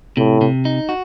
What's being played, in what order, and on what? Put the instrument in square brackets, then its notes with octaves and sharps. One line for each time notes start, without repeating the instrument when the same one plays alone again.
[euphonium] A2 [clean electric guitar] C3
[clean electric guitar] C3
D#4
F#4